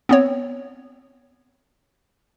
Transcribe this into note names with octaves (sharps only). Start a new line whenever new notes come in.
B3 C4 C#5